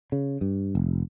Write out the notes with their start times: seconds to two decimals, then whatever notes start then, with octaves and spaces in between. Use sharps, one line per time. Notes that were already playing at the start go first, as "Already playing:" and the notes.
0.12 C#3
0.41 G2
0.75 F1